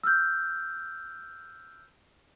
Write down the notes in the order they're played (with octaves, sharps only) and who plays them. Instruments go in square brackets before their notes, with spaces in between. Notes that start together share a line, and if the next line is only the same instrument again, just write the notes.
[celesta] E6 F6 G6